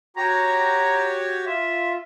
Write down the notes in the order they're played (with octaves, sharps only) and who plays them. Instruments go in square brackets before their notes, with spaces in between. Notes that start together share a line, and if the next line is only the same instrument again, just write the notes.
[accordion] F#4 G4 C#5 [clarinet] A#5
[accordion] F4 [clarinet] E5